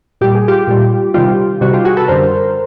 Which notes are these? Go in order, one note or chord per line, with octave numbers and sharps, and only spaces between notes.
A#2 G3 G4
G#4
F4 G4
A#2 G3
C3 D#3 G3 F4 G4
C3 D#3 G3 F#4
F4 G4
F#4 G#4
A4 B4
F#2 D3 G3 A#4 C5